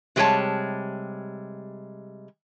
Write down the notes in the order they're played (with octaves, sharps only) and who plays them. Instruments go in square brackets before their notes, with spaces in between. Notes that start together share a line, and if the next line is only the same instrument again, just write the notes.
[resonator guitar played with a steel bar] C3 G3 G#3 B4 C#5 A5